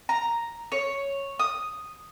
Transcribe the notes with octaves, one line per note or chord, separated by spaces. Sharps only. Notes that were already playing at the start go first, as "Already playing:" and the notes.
A#5
C#5
D#6